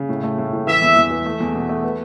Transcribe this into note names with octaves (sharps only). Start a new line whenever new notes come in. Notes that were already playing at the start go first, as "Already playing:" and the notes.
Already playing: C#3
A2
A3
A2
A2
E3 E5
E2
E2
E3
A3
E2
B2
A3
B3